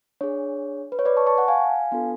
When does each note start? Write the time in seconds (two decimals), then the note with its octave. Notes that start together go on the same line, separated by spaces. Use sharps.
0.21 D4 G#4 C#5
0.92 B4
0.99 C#5
1.05 B4 D5
1.17 A5 C#6
1.27 A5 C#6
1.38 F#5 A5
1.48 F5 G#5
1.91 B3 D4 F4 A4